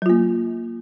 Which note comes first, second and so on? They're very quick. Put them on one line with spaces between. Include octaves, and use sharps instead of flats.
F#3 F4 A#3